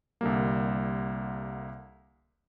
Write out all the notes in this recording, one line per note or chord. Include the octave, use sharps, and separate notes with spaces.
C2 D3 G3 A#3